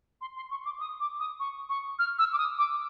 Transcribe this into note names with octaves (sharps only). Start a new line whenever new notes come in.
C6
C6
C#6
D6
D#6
D6
D#6
C#6
C#6
F6
E6
D6
D#6
D6